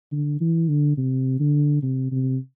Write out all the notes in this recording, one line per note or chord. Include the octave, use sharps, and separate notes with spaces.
D3
E3
D3
C3
D3
C3
C3